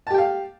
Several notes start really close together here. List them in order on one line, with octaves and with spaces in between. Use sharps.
A5 G4 G5 F5